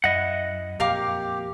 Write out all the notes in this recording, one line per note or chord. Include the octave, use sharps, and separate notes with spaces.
F#2 E4 D#5 F#5
F2 A#2 G4 A#4 F5 D6